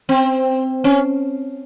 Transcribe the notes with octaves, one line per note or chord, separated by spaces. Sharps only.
C4
C#4